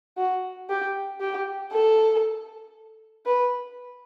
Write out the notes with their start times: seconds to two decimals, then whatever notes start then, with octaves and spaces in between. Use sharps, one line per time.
0.17 F#4
0.69 G4
1.21 G4
1.72 A4
3.26 B4